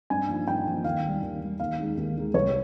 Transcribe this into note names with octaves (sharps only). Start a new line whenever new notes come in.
G2 G#5
F3 A#3 D#4
G2 G5
F3 A#3 D#4
D#2 F5
D#3
G3
D#2
D#3 G3
D#2 F5
D#3 G#3 D#4
D#2
D#3 G#3 D#4
C2 C#5